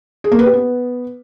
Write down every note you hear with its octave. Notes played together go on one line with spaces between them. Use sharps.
G#4
A#3
B4
G4
B3